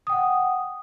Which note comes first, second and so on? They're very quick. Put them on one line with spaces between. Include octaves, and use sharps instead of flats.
D#6 G5 F#5